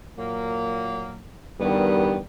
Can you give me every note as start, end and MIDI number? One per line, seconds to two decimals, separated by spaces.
0.17 1.26 46
0.17 1.26 54
0.17 1.26 58
1.60 2.20 40
1.60 2.17 43
1.60 2.20 50
1.60 2.17 51
1.60 2.17 55
1.60 2.20 59